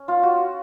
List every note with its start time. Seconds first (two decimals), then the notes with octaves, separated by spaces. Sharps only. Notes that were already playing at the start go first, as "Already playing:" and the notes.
Already playing: C#4
0.08 F4
0.23 F#4